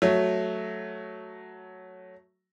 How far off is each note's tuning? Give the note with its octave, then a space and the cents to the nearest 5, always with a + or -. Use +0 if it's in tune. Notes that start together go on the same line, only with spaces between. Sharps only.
F#3 +0 A3 +0